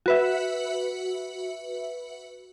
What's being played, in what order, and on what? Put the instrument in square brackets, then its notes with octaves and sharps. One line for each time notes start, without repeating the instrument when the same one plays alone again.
[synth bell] F#4 B4 E5